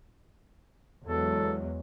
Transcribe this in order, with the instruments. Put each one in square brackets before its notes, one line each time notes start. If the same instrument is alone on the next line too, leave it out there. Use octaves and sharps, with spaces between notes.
[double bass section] E2 F#3 G#3 [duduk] A4